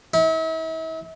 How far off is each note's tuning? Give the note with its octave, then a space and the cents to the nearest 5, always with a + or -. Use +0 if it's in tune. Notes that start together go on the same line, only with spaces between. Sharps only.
E4 -40